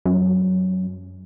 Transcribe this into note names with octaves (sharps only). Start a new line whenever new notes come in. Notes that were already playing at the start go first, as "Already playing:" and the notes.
F#2